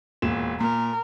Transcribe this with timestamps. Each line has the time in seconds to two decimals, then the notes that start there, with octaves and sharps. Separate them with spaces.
0.22 E1 A#2 E7
0.60 A#2 A#4